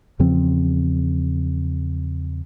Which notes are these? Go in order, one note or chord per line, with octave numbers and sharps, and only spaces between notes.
E2 C#3 F3 C4